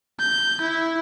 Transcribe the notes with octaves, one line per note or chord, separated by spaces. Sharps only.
G6
E4